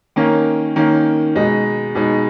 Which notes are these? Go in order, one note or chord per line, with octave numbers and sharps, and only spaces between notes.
D#3 A#3 C#4
D#3 A#3 C#4
B2 G#3 D#4
B2 G#3 D#4